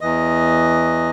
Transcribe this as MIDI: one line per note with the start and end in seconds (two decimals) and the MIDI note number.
0.01 1.10 40
0.01 1.10 52
0.01 1.10 75